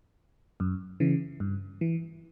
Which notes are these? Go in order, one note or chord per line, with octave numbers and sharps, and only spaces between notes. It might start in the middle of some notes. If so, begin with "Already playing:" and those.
F#2
C#3 E3
G2
E3